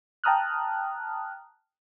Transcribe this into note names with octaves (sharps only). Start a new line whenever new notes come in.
G5 A5 A#5 D#6 F6 F#6